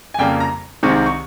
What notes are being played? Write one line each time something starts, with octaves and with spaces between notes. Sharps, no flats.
G#5
F2 C#3 G3 A#3 G5
A#5
C2 C3 D#3 G#3 C4 C#6
C#6